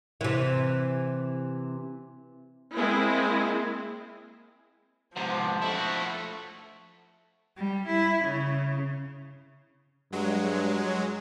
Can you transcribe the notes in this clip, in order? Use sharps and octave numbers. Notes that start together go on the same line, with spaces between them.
C3 E3
G#3 A#3 C4 E4
G#2 C3 F3 B3
A3 E4 F#4
G3
E4
C#3
G2 F#3 G#3